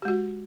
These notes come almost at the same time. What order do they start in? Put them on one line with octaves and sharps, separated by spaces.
G4 G#3 F#4